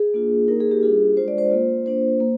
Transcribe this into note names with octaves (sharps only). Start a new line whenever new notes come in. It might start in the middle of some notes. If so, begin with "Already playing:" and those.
Already playing: G#4
A#3 D4 F4
A#3 D#4 A#4
G#4
G4
G3 D4 F4 G#4
G#3 D4 F4 C5
D5
C5
A#3 F4
A#3 D4 F4 C5
A#3